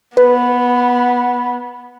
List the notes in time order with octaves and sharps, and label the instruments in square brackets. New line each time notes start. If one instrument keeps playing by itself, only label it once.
[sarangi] B3 [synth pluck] B4 [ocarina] B5